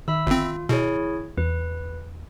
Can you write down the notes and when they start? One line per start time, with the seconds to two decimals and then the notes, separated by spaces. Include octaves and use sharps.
0.08 D#3 E5 B5 E6
0.27 G1 C4 F4
0.69 B2 E4 G#4 C#5
1.38 E2 B4